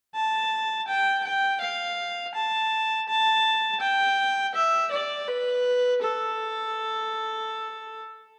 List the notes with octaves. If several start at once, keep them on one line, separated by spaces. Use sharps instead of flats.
A5
G5
G5
F5
A5
A5
G5
E5
D5
B4
A4